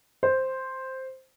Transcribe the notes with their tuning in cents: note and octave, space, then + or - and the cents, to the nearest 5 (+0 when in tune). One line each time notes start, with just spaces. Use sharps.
C5 +0